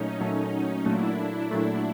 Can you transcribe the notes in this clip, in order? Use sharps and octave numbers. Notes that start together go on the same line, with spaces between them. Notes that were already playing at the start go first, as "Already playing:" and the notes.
Already playing: A#2 F#3 A3 C#4 D#4
A#2 F#3 A3
A#2 F#3 A3 D4 E4
D4 E4
A#2 F#3 A3